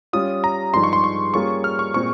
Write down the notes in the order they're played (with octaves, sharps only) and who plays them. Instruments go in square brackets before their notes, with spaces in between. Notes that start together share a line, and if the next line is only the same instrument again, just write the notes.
[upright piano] G3 C#4 F4 [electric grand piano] D#6
[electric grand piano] A#5
[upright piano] G2 F3 G#3 D#4 G#4 [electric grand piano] C6
[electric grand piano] C#6
C6
C#6
[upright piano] G3 A#3 C#4 F4 G#4 [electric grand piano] C#6
[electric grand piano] F6
C#6
[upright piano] A#2 G#3 C4 [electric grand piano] C#6